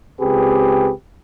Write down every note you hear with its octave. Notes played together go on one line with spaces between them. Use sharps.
C#2 C4 G4 G#4 B4